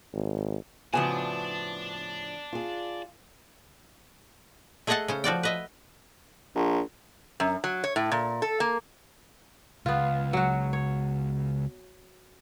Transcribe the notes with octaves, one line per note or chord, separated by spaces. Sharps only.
G#1
A2 C#3 F3 B3 F#4 D5 G#5 A5
F4 G#4
A3 G#4 A4 D#5 F#5 A5
C#3 C#4 C5
F3 F#4 D5 G5
B4 D#5 E5
A#1
F#2
F#3
C#5
A2
A#2
A4
A#3
C#2 B3 F4
F#3 F#4
C#5